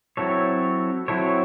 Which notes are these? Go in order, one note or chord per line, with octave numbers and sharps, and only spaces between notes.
F#3 C4 E4 A4 C#5
F#3 C4 E4 A4 C#5